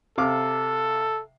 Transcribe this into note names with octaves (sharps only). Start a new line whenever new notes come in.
C3 A4 F5 D6